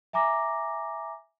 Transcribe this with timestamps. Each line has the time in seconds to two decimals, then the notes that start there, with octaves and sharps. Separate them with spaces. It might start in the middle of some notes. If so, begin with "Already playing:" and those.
0.13 E5 G#5 A#5 D6 A#6